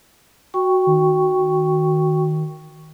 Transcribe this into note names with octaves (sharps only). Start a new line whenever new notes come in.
F#4 G5 C#6
D#3